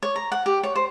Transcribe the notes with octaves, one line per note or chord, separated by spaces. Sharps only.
C#5
A#5
F#5
G4
C#5
C5